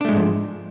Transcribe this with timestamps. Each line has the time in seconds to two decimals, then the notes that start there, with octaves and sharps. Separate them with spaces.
0.01 D4
0.05 A3
0.09 G#3
0.13 G#2
0.16 F3